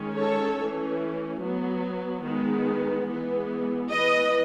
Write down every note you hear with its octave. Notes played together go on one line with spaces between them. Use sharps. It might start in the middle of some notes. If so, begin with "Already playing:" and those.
Already playing: D#3 G#3 C#4
A4 C#5
E3 A3 C#4
F#3 B3
D#3 G#3 B3
E3 G#3 B3
E3 B3 B4 D#5